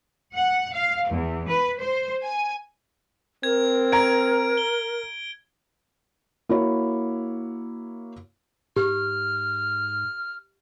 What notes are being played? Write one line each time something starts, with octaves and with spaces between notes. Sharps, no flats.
F#5
F5
E2
B4
C5
G#5
C4 A#4 G#6
A#5 G#6 D7
G7
A#3 E4 F#4 C#5
G#2 G4 F6